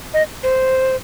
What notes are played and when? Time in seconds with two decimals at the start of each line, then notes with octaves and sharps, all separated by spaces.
0.14 D#5
0.43 C5